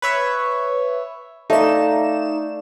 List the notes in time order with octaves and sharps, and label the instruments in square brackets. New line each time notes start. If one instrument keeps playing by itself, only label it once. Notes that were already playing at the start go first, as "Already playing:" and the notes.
[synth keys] B4 C#5 E5
[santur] A3 D5 F5 [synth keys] D#4 E7